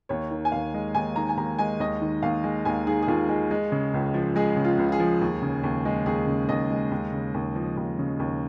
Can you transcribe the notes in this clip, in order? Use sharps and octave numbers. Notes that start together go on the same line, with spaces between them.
D#2 C#5
D#3
G#5
D#2 F5
G#3
D#2 G#5
D#3 A#5
G#5
D#2 A#5
G#3 G#5
D#2 D#5
D#3
D#2 F5
G#3
D#2 G#5
D#3 G#4
G#4
D#2 F4
G#3 G#4
G#3
C#3
C#2
F3
G#3 G#4
C#3
F4
C#2
F4
G#4
F3
D#2
C#3
D#2
G#3
D#2 G#4
C#3
D#2 D#5
G#3
D#2
C#3
D#2
F3
D#2
C#3
D#2